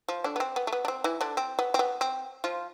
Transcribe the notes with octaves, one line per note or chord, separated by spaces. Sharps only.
F3
D3 D4
B3
C4
B3
A3
B3
D4
C4
E3 E4
D3 D4
C4
B3
C4
B3
C4
F3 F4